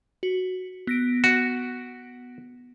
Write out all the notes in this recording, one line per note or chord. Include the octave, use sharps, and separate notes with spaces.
F#4
B3 A#6 D7
F#4